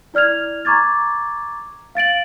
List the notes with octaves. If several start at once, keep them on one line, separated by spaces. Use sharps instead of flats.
E4 D5 F6 G#6 F7
A#5 C#6 D6 G#6 A6
F5 A6 D7 F#7